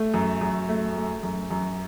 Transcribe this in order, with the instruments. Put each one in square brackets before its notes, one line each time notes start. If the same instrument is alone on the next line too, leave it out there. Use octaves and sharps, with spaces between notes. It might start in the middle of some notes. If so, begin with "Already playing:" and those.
Already playing: [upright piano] A3
F#2
F#2
A3
A3
F#2
F#2